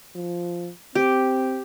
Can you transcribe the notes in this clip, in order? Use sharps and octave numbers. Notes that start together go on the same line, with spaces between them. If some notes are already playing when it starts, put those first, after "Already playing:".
F3
C4 G4